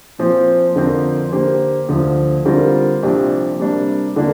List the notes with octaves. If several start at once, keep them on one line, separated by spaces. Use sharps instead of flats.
A#2 F3 C4
F2 D3 F3 C4 A#4
D3 A#3 G4 C5
D2 D3 F3
D3 G3 C4 F4 A#4
C2 A#2 F3 D4 G4
C3 G3 A#3 D4
D3 A#3 D4